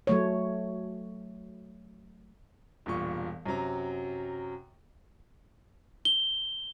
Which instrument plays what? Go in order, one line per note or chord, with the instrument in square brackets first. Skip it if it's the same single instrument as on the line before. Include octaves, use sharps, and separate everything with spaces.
[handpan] F#3 A3 C#5
[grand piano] E1 G2 A#2 C#6
F#2 C3 F#3 A#5
[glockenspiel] G7